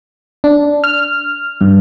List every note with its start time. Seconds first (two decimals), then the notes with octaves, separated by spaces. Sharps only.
0.44 D4
0.84 F6
1.61 G2